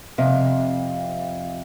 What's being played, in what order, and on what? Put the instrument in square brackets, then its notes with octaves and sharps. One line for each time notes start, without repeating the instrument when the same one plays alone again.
[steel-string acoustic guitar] F2 C3 F5